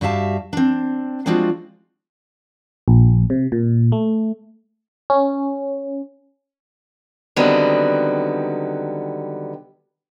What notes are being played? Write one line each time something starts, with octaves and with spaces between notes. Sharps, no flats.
G2 F#4 G4 E5 F5 A5
C4 D4
F3 G#3 C4 D4 F4 F#4
A#1
C3
A#2
A3
C#4
D3 D#3 F#3 G3 B3 C4